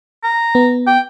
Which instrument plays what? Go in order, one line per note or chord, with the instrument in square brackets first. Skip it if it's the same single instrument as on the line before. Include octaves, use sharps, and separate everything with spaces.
[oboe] A#5
[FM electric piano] B3
[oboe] G5